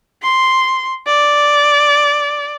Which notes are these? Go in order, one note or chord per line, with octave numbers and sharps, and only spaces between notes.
C6
D5